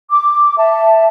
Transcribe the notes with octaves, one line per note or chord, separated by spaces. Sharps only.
D6
E5 A5